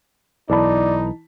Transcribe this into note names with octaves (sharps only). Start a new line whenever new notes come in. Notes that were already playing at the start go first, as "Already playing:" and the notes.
B1 E3 D#4 D5 A5 B5